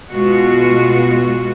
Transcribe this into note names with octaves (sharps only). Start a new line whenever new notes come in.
B2 G#3 F4 F#4